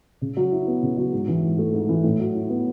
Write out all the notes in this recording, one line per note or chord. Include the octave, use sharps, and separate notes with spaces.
C#3
F#3
E4
B3
C#3
F#3
G#2
E3
G#2
A3
G#2
E3
A2
F#3
E4
B3